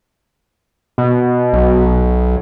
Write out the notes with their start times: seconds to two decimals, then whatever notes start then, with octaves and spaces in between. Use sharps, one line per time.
0.98 B2
1.53 B1